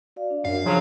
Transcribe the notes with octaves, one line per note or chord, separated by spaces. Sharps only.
F#4 D5 F5
D4
F#2 F5
C#3 F3 F#3